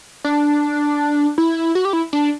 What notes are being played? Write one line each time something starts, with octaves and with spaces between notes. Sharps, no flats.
D4
E4
F#4
G4
E4
D4